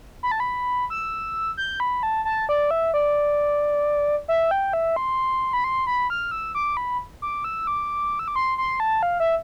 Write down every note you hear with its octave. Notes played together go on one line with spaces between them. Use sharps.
B5
A5
B5
E6
G6
B5
A5
A5
D5
E5
D5
E5
G5
E5
C6
B5
C6
B5
F6
E6
D6
B5
D6
E6
D6
E6
D6
C6
C6
A5
F5
E5